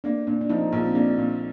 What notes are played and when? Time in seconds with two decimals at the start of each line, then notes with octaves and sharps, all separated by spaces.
0.04 A#3 D4
0.27 A#2 D4
0.41 D4
0.49 F3 D#4
0.72 A#1 F4
0.85 C4
0.95 A#3 D4
1.18 A#2